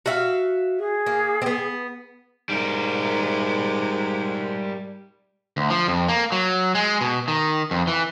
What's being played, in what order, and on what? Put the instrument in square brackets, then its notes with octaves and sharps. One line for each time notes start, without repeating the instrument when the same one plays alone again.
[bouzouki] F#4 E5 F5
[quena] G#4
[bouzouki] A#3
B3 C4
[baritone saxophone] G#2 [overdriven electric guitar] G3 A#4
[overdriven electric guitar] D2
F3
F2
A#3
F#3
G#3
B2
D#3
F2
E3